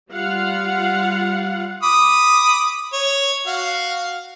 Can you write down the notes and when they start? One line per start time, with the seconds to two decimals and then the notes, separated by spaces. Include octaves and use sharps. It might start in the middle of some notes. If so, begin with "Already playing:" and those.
0.11 G3 F4 F5 F#5
1.83 B5 D6 D#6
2.93 C#5
3.47 F#4 F5